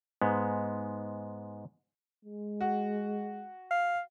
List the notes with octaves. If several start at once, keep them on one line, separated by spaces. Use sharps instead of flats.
G#2 G#3 B3
G#3
F#4
F5